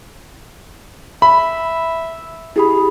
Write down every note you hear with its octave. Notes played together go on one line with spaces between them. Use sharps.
E5 B5
E4 G4 G#4 B5